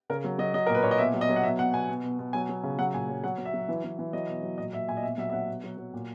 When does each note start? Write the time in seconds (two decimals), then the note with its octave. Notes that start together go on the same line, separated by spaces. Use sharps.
0.10 C#3 A#4
0.24 F#3
0.38 F#3 D#5
0.54 F#3 D#5
0.66 A#2 A#4
0.75 B4
0.83 A#2 C#5
0.91 D#5
0.98 B2 E5
1.14 F#3
1.21 D#5
1.29 F#3
1.36 F#5
1.43 B2 E5
1.59 B2 F#5
1.74 B2 G#5
1.89 B2
2.04 B2
2.19 B2
2.33 F#3 G#5
2.49 F#3
2.63 C#3
2.79 F#3 F#5
2.94 A#2 G#5
3.09 F#3
3.24 F#3 F#5
3.38 F#3
3.45 E5
3.54 F#3
3.68 E3
3.84 E3
3.99 E3
4.13 F#3 D#5
4.28 B2
4.43 F#3
4.58 A#2 D#5
4.73 A#2 E5
4.88 A#2 G#5
4.97 D#5
5.03 B2 E5
5.18 F#3 E5
5.30 E5
5.33 F#3 F#5
5.48 B2
5.64 F#3
5.78 F#3
5.94 A#2